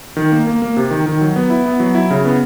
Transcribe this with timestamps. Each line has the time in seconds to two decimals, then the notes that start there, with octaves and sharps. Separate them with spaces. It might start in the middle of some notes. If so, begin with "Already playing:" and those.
0.17 D#3
0.32 A#3
0.47 A#3
0.62 A#3
0.77 C3
0.91 D#3
1.06 D#3
1.21 F#3
1.36 B3
1.50 E4
1.66 B3
1.80 F#3
1.95 E4
2.10 C#3
2.25 B3